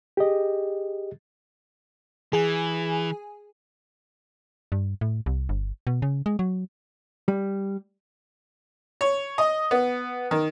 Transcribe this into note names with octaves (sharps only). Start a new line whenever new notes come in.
G4 G#4 D#5
E3 G#4 G#5
G2
A2
C2
G1
B2
C#3
G#3
F#3
G3
C#5
D#5
B3
D#3